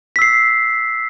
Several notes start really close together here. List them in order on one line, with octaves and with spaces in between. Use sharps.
B6 E6 C7